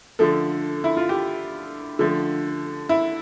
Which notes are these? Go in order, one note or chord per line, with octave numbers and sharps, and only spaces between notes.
D3 F3 A3 A4
E4
F4
G4
D3 F3 A3
E4